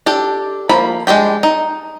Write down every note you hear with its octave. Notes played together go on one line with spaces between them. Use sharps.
D4 G4 A4
F3 A#3 B5
G#3 D4 G4 G5
D#4